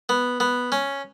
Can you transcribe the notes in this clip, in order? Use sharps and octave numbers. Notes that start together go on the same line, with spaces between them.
B3
B3
C#4